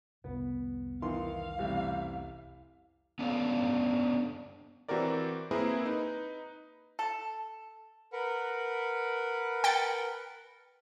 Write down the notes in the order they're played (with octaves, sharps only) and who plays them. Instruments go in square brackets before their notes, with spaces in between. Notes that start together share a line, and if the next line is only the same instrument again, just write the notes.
[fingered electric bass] F1 C2 [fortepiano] B3
[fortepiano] D#3 E3 C6 [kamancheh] F5
[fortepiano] A1 C3 G3
[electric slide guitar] B3 C#4 D4 A4 C#5 F5
[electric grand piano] E3 C4 F#4 G4 A#4 D5
A#3 C4 E4 G#4 A#4 B4
D#4 B4
[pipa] A4
[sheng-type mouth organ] A#4 B4 F#5
[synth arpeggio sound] G5 A6 C#7